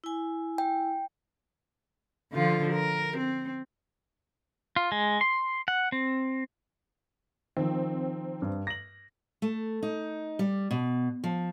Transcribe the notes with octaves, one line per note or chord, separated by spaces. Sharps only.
E4 G#5
G5
D3 F3 F4
A#4
C4
F4
G#3
C6
F#5
C4
D#3 F3 C4
G2
A#6 F#7
A3
D#4
G3
B2
F3